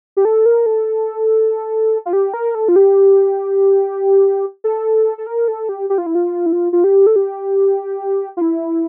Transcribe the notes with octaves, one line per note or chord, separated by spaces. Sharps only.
G4
A4
A#4
A4
F4
G4
A#4
A4
F4
G4
A4
A4
A#4
A4
G4
G4
F4
E4
F4
E4
F4
F4
G4
A4
G4
F4
E4